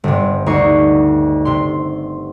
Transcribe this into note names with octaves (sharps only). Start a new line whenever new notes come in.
G1 C3
D2 D#4 C#6 C7
C3 C6